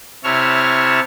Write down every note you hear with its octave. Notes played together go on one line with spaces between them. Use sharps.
C3 E4 C#5 A5 F6